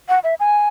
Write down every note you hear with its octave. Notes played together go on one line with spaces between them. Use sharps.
F#5
E5
G#5